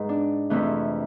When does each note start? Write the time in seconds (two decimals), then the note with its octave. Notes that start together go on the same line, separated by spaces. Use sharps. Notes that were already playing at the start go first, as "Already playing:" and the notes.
Already playing: G#2 B4
0.09 D4
0.50 F2 C3 E3 A3